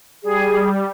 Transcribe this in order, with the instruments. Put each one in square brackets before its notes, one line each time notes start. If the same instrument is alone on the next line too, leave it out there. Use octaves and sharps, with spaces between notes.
[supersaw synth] G3 [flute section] G#4